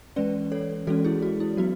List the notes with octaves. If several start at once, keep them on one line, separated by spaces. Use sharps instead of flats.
E3 G#3 C#4 B4 D5
A4 C#5
E3 G#3 C#4 F#4 A4
E4 G#4
F#4
E4
F#3 B3 F#4